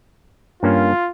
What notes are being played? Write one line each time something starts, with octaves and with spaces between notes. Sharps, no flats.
G2 A#3 C#4 F4